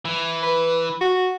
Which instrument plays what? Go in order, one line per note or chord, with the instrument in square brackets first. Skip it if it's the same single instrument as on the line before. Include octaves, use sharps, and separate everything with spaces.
[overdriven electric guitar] E3
[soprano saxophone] B4
F#4